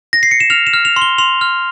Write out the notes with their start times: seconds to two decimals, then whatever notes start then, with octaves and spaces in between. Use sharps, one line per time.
0.13 A#6
0.23 C7
0.31 C#7
0.40 E7
0.50 F6 F7
0.67 E7
0.73 F6
0.85 F7
0.96 C6
1.02 G7
1.18 C6 F7
1.41 F6